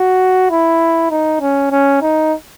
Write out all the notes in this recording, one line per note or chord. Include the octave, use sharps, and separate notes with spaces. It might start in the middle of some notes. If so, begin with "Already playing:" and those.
Already playing: F#4
E4
D#4
C#4
C#4
D#4